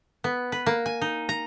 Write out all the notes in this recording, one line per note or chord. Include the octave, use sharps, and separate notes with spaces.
B3
B4
A#3
G#5
D#4
A#5